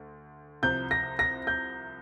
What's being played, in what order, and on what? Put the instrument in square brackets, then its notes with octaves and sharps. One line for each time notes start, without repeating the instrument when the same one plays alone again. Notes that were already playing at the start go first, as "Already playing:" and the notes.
Already playing: [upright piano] D2
[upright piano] C2 C3 F3 C4 [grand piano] G6
[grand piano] A#6
A#6
G6